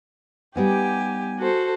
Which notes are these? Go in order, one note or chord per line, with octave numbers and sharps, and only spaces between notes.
G3 B3 D#4 G4 G#5
F#4 A4 C5